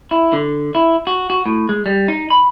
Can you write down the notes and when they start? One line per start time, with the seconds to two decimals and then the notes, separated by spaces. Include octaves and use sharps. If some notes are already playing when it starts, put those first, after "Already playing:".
0.11 E4
0.33 D3
0.75 E4
1.07 F#4
1.30 F#4
1.46 A2
1.69 G#3
1.86 G3
2.08 D#4
2.30 B5